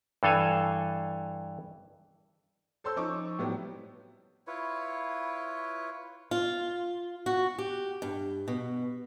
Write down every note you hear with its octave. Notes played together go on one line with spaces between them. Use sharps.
G2 E3 A4 F5 G#5
A4 C5 C#5 C6 E6 G6
F3 C#4 D#4 C#6 D6
A2 F#3 G3 B3 C4
E4 F4 B4 C#5
F4
F#4
G4
G2
B2